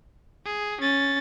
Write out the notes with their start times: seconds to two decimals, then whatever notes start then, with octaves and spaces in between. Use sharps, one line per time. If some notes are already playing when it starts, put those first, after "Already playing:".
0.45 G#4
0.81 C#4 A6